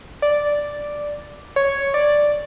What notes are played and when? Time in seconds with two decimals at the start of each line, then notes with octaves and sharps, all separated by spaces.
0.22 D5
1.56 C#5
1.94 D5